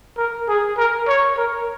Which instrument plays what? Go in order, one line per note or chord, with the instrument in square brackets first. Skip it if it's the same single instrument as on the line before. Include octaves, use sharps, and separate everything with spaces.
[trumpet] A#4
G#4
A#4
C#5
A#4